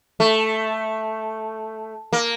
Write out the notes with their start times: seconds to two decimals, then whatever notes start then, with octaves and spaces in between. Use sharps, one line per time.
0.20 A3
2.13 A#3